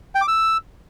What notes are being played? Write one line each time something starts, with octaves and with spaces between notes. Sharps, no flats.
G5
D6
E6